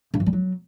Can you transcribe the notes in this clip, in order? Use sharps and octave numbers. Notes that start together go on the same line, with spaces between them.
G2
E3
G3
F#3